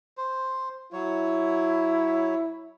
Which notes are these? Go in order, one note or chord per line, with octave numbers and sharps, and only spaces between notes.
C5
F#3 E4 C#5